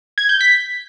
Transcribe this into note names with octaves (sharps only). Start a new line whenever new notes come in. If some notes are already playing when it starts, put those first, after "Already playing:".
G#6
G6
B6